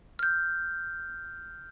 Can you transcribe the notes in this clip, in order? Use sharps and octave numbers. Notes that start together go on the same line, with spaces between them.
F6 G6